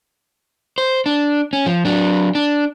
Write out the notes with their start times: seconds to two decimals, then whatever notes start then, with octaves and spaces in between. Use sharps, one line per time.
0.78 C5
1.06 D4
1.53 C#4
1.66 F3
1.85 F#3 D4
2.35 D4